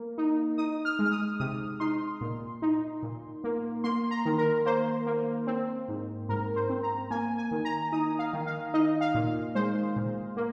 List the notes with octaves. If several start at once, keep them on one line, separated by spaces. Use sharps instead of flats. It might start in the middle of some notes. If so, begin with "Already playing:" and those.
Already playing: A#3
D#4
D#4 D#6
F6
G#3
F6
D#6
C3 D#6
D#4 C6
A#2
D#4
A#2
A#3
A#3 C6
A#5
D#3
A#4
A#3 C5
A#3
C4
G#2
G#2 A#4
C5
C4
A#5
A#3 G#5
G#5
D#3
A#5
D#4 D#6
F5
D#3
F5
D#4 D#5
F5
A#2
G#3 C5
A#2
A#3